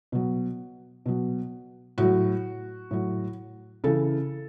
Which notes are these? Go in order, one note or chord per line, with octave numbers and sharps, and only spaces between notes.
B2 F#3
B2 F#3
A2 F#3 F#4
A2 F#3
C#3 E3 A4